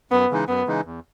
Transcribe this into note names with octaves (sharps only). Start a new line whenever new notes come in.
F#2 B3
C#3 E3 G#3 D#4
F#2 B3
C#3 E3 G#3 D#4
E2